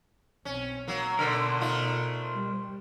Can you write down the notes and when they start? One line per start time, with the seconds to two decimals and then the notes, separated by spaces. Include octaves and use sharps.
0.45 B1 C4 C#4
0.88 F#3 A#3
1.19 B2 D3 A#4 C5
1.61 A3 D#4 F4
2.35 G3